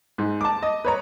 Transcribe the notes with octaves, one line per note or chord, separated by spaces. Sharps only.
G#2
A5 D6
D#5
B4 C#5 A#5